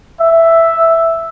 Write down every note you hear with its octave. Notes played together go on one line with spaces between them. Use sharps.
E5